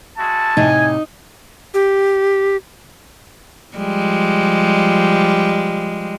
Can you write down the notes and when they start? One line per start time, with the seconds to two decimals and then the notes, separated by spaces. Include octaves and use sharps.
0.18 G#3 F#4 E5 A5
0.57 A2 C3 D#4 G#5
1.74 G4
3.77 F3 G3 G#3